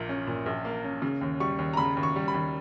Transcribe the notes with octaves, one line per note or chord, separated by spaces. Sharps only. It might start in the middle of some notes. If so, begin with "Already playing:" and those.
Already playing: A#1 A#2 A#3
C#4
A#2
A#1
A#3
C#4
C#3
D#2
G3 C#6
D#2
A#5
C#3 B5
D#2
C#6
G3
B5
D#2